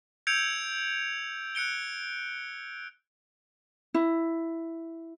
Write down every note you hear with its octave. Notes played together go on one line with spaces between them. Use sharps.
E6 G6 G#6 C#7 D7 F7
F#6 C#7 D7 G7
E4